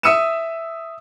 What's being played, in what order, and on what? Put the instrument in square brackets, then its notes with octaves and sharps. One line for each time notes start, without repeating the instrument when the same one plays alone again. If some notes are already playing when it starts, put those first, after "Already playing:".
[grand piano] E5 D#6 E6 C#7 D#7 E7